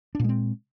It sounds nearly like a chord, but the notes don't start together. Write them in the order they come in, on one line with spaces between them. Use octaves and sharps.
D4 A#2 G#3 C4